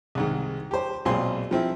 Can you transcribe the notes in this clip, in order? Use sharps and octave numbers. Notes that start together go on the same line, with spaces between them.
C2 G#2 D#3
G4 C5
B1 A#2 G#3 C4 G#5 C6
F3 C4 E4